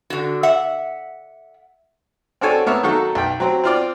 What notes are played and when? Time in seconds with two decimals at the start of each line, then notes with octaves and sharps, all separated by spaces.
0.10 D3 F#4
0.43 E5 F#5
2.41 C4 D4 F#4 A4 C#5 G#5
2.66 A#3 B3 C#5 E5
2.83 D#3 F#3 A4 F#5 C#6
3.15 B1 G5
3.40 F#3 C4
3.64 C4 F4 D5